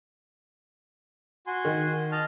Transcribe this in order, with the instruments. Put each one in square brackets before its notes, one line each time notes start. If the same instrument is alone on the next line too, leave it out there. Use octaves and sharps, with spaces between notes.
[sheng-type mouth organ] F#4 G#5 C6
[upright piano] D#3
[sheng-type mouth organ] D#5 A5 F6